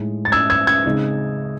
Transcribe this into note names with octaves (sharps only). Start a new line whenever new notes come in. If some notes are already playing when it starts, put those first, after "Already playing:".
Already playing: A2 G#3 D#4
A6
E6 G#6
E6 G#6
E6 G#6
C#3 G#3 C4 D#4